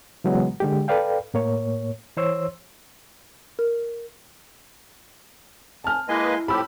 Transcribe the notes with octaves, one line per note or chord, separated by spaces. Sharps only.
C#3 E3 F#3 G#3 B3
D3 G#3 G4
A4 B4 D5 F5 G5
A2 A#3 C#5
E3 C5 C#5 C6 E6
A#4
G#5 A5 F6
G#3 A#3 E4 B4 D#5 G#5 C6
A2 F3 G4 A5 B5 E6